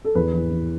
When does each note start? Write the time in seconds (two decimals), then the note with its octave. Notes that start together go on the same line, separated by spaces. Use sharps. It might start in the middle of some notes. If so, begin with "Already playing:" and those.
0.05 A4
0.15 E2 B4
0.33 E3
0.51 E3